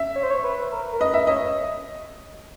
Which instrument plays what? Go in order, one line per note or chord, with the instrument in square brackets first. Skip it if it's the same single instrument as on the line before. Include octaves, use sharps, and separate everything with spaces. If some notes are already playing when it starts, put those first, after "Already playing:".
Already playing: [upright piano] E5
[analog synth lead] C#5
C5
C#5
B4
A#4
A#4
[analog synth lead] B4 [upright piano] D#5
[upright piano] E5
[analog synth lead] C#5 [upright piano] D#5